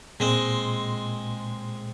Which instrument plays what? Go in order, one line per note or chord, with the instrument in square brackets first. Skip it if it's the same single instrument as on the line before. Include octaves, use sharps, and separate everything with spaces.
[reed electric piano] A#2 [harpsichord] G#3 C4